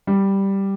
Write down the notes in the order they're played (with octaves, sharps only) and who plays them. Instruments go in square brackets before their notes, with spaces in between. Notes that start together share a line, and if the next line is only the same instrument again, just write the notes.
[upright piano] G3